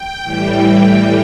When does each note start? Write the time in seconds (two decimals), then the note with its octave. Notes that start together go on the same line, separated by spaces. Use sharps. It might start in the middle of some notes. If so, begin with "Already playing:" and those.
Already playing: G5
0.23 A2 E3 G3